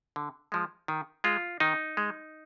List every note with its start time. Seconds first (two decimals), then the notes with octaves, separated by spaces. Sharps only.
0.16 D3
0.52 F3 G#3
0.88 D#3
1.24 G#3 F4
1.60 D#3 D#4
1.97 G#3